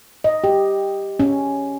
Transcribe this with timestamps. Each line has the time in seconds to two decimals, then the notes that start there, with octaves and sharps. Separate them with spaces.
0.24 D#5
0.44 G4
1.20 C#4